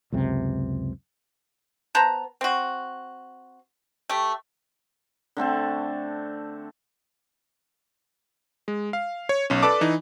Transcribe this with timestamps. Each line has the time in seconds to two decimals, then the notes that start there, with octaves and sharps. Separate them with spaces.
0.12 C#2 F#2 C3
1.95 B3 C5 A5 A#5
2.41 C4 F#4
4.10 A3 G4
5.37 D3 A3 C4 A5
8.68 G#3
8.93 F5
9.29 C#5
9.50 B1 C#4
9.63 A4 B4 D5 A5 D6
9.81 E3 D#4